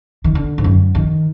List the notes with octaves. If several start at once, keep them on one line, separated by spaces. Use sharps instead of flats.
D#3
D3
G#2
F#2
D#3